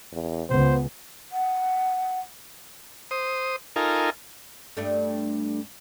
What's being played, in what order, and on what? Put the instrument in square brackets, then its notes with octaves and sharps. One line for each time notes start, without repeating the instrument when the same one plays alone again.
[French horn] E2
[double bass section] C#2 [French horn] B3 [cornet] C5
[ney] F#5
[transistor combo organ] C5 D#6
D#4 F4 A4 A#4 G#5
[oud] G2 A3 D4